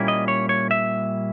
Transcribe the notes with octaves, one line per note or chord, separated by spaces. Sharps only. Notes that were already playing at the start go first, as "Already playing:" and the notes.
Already playing: A#2 G3 A#3 C#4 E4
D#5
C#5
C#5
E5